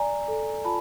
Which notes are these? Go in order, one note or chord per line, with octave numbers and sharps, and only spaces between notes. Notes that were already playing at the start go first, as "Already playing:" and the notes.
Already playing: D5 G#5 A#5
A4
F4 A5 B5